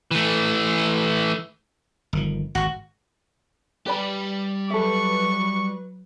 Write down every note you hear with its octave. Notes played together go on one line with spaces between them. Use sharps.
E3 A3
G1 D#3 F3
G#1 F#4 C#6
G3 G4 B4 D5 B5
F#3 A4 B4 E5 C#6